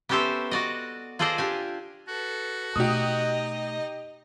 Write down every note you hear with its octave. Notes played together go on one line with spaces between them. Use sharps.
B3 C#4 G4 A4 C5 E5
F#4 D5 D#5
F4 G#4 A4 C5 D5 D#5
D4 G4 G#5
F#4 A4 B4
B2 A3 D#4 G4 D#5 D#6